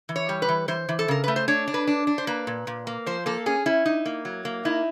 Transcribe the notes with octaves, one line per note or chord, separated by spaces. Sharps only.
E3
C#5
G3
B4
E3
E3 C5
E3
A4
C#3 A#4
A3 B4
C5
D4 C#5
D4
B4
D4
D4
C5
A#3 B4
A#2
A#2
A#3
F3 C5
A#3 A4
C#4 G#4
C#4 E4
D#4
A#3
F#3
A#3
D#4 E4